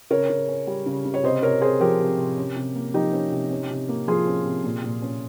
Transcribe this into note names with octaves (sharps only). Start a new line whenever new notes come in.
C#3 A#4 C#5
C#3
C#4
G3
C#3
C#3
C#5
C3 C5 D#5
C3 A#4 C#5
C4 G#4 C5
F3 G4 A#4
C3
C3
C#4
C3
A#3
F3 D#4 G4
C#4
C3
C#4
C3
A#3
F3 F4 G#4
C#4
C3
A#2
A#2
C#4